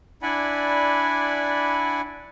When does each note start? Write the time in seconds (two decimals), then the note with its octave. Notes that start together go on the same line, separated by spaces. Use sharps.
0.22 D4 E4 D5 F#5 G#5 B5